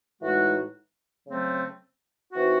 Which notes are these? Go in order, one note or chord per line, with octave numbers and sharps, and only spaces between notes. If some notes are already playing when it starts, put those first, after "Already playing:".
A2 E3 G#3 D#4 F#4
C#3 F#3 A3 C4
E3 C4 D#4 F#4